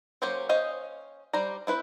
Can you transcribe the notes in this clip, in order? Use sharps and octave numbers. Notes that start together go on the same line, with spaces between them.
F#3 A#3 C#4 G4 C5
C#4 C5 D#5 F5 G5
G3 C5 D5 A#5
C4 E4 B4 C5